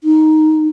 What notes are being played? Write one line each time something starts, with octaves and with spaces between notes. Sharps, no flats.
D#4